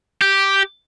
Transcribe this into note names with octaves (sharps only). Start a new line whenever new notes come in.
G4